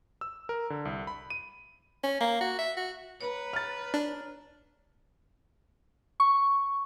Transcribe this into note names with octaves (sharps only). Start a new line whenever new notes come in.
E6
A#4
D3
C2
B5
D#7
C#4
A#3
F#4
E5
F#4
B4 C#5 A#5
F6 A6
D4
C#6